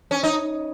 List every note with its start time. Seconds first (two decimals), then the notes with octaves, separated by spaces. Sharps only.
0.11 C#4
0.23 D#4